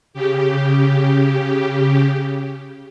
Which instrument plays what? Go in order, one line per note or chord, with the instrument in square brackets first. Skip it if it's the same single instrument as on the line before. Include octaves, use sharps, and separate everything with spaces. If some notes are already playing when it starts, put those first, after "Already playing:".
[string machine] C#3 G4